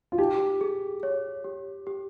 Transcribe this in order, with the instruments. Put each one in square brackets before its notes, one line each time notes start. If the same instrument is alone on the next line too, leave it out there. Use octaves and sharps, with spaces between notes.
[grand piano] F4
[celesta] D#4 [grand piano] G4
[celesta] G#4
C#5
G4
G4